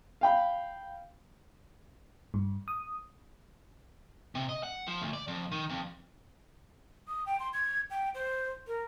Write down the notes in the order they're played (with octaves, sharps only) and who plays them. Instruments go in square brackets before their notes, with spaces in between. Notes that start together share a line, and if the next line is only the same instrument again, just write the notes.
[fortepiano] F5 G5 B5
[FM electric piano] G2
D#6
[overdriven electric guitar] C3
D#5
F#5
F3
D2
D5
F2
D#3
F2
[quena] D#6
G5
C6
G#6
G5
C5
A#4